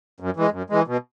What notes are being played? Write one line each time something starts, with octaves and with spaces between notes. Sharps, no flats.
F#2
E3 G#3
F#2
E3 G#3
B2